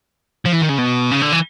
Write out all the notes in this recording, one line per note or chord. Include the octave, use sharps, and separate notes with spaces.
F3
E3
D#3
C#3
B2
C#3
D3
E3